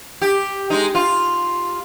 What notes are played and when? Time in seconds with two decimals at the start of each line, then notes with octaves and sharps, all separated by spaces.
0.22 G4
0.70 G#3 D#4
0.95 F4